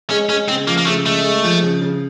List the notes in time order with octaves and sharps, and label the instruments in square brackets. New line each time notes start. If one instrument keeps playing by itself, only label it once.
[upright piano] G#3 [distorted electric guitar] C#4
[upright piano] G#3 [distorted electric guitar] C#4
[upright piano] C#3 [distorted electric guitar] C4
[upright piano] F3 [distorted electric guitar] A#3
[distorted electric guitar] A#3
[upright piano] C#3 [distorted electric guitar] A3
[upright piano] G#3 [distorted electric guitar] A3
[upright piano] G#3
F3
C#3
C#3